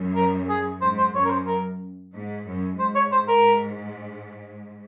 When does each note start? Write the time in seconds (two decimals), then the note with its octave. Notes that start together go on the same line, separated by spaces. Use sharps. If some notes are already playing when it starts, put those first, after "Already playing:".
Already playing: F#2
0.16 A#4
0.49 G#4
0.81 G#2 C5
0.98 C5
1.15 F#2 C#5
1.25 A#4
1.31 C5
1.47 A#4
2.14 G#2
2.46 F#2
2.79 G#2 C5
2.95 C#5
3.12 C5
3.28 A#4